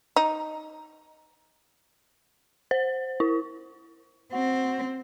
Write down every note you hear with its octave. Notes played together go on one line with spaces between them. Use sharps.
D#4
C5
E4
C4 F#4